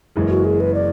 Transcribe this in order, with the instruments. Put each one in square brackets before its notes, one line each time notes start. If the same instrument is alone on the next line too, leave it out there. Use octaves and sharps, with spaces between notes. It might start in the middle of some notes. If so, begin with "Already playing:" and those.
[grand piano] F#1 F#2 E3 G#3
[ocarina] F#4
G#4
B4
D5